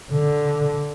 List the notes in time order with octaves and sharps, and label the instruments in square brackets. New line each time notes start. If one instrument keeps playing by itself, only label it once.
[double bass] D3